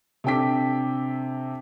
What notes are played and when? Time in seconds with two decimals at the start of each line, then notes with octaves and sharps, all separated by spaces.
0.24 C3 D4 A4 G5 D6 B6